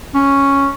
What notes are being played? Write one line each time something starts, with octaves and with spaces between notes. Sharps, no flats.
C#4